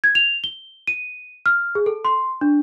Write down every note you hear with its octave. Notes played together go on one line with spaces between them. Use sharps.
G#6
F7
G7
D#7
F6
G#4
A4
C6
D4